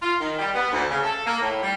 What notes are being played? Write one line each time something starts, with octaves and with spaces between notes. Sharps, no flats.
F4
D#3
G3
B3
D2
C#3
A4
A#3
A2
G3